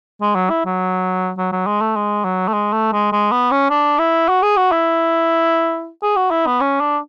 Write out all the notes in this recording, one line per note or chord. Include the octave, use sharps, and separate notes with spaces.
G#3
F#3
E4
F#3
F#3
F#3
G#3
A3
G#3
F#3
A3
G#3
A3
G#3
G#3
B3
C#4
D4
E4
F#4
G#4
F#4
E4
G#4
F#4
E4
B3
C#4
D4